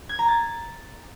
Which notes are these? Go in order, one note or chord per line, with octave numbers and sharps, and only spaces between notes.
G#6
A#5
A6